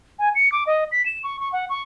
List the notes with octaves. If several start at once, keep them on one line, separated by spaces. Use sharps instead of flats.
G#5
C#7
D6
D#5
B6
E7
C#6
C#6
F#5
C#6